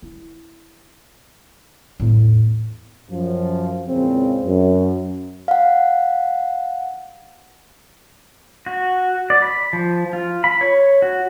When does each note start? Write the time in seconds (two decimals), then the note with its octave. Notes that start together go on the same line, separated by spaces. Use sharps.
0.02 E4
2.00 E2 A2
3.10 F#2 F3
3.87 E2 A#2 C#3 G#3 C4
4.45 F#2
5.48 F5 F#5
8.66 F#4
9.30 D5
9.42 B5
9.73 F3
10.13 F4
10.44 B5
10.61 C#5
11.02 F#4